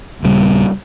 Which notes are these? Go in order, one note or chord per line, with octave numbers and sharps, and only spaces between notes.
D#1 C#3 G3